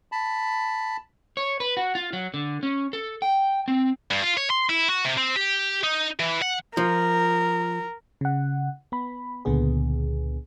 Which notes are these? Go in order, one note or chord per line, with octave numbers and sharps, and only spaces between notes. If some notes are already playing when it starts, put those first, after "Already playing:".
A5 B5
C#5
B4
F#4
F4
F#3
D3
C#4
A4
G5
C4
G2
F4
C#5
C6
E4
F#4
C3
C4
G4
D#4
E3
F#5
F3 A#4
C#3 F#5
B3 B5
C#2 A#2 D3 B3 G#4